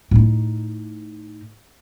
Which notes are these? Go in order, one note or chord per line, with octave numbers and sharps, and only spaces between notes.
A2 D#4